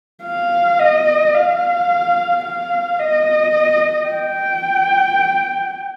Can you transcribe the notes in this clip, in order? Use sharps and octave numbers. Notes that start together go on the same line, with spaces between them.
F5
D#5
F5
F5
D#5
G5